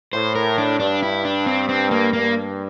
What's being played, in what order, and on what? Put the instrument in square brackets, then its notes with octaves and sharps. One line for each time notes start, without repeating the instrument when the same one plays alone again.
[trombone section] A2 [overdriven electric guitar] C5
[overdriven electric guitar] A#4
D4
[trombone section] G2 [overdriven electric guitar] D4
[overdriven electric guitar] E4
D4
C4
C4
A#3
[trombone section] G2 [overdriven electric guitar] A#3